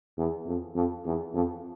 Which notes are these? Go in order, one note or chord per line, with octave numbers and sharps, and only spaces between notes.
E2
F2
F2
E2
F2